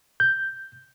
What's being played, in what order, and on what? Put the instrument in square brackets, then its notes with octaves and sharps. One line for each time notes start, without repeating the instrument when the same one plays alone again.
[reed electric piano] G6